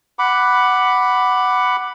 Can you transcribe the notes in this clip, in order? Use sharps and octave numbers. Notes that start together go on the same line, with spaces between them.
F#5 B5 D6